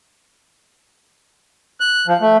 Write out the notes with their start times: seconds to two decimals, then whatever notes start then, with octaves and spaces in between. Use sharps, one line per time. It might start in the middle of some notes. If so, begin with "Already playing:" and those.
1.80 F#6
2.07 F3
2.21 A3